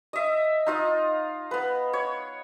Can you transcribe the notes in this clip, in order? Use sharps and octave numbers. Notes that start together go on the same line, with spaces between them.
D#5 E5
D#4 F4 D#5
B3 B4
C#5